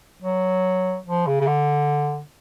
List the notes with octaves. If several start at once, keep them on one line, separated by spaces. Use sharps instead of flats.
F#3
F3
C#3
C#3
D3